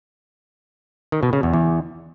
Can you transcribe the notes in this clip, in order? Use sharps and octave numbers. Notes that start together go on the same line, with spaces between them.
D#3
B2
C#3
E2
E2